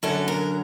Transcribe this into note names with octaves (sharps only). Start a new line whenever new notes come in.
F#2 D3 F#3 A4
A#4